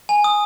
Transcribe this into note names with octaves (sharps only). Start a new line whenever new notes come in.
G#5
D#6